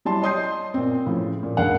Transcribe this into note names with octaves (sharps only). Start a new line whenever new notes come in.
F#3 G3 E4 A5 C6
C#5 D#5 C6 D#6 G6 C7
A#2 C4
A2 C#3 F3
A#2
G#1 C#2 A#3 D4 F5 F#5